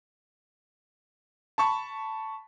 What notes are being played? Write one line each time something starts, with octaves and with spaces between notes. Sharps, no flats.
A5 B5 C#6